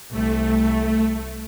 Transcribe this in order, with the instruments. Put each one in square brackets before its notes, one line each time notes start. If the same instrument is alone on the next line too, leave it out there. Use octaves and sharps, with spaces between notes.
[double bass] C2 [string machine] A3